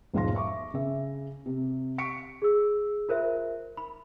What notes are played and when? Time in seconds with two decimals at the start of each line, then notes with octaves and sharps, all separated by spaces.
0.13 E1 G#2 F3 F5 C6 A#6
0.35 E5 C#6 D6
0.74 C#3 E5
1.46 C3
1.98 C#6 B6 C#7 D7
2.42 G#4 E6
3.09 F4 A#4 C5 E5
3.77 B5